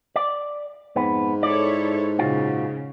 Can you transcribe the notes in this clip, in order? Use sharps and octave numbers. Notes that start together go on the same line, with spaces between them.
D5
F2 G#2 B3
E4 A4 C#5 D5
A#2 C#3 F4 F#4